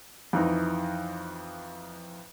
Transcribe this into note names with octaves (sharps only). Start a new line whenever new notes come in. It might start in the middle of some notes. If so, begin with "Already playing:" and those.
F2 E3 D#4